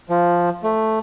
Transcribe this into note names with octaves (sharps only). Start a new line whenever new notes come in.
F3
A3